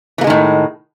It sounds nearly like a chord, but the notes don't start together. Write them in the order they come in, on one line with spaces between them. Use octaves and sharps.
E3 A#3 G#3 D#3 A2